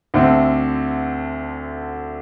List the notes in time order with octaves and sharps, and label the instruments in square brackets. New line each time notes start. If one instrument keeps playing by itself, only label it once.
[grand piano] D2 D3 A3 C4